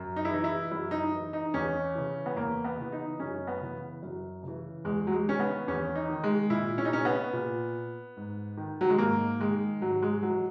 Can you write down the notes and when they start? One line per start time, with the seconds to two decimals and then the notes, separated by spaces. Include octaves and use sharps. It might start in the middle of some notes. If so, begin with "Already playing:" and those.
Already playing: F#2
0.16 D#4
0.25 E4
0.29 E3 D#4
0.44 E4
0.71 F#2 E4
0.91 D#4
1.12 E3
1.33 D#4
1.54 E2 C#4
1.95 C#3 E3
2.26 B3
2.36 E2 A#3
2.65 B3
2.78 C#3 E3
2.92 D#4
3.20 F#2 C#4
3.47 B3
3.61 C#3 E3
4.02 F#2
4.43 C#3 E3
4.84 E2 G#3
5.07 F#3
5.12 G#3
5.27 D#3 C#4
5.39 B3
5.67 E2 C#4
5.95 D#4
6.10 D#3
6.23 G#3
6.50 A#2 E4
6.78 C#4
6.85 D#4
6.93 C#4
7.05 B3
7.33 A#2
8.17 G#2
8.57 D#3
8.81 F#3
8.90 G#3
8.98 G#2 A#3
9.40 D#3 G#3
9.81 G#2 F#3
10.02 G#3
10.22 E3 F#3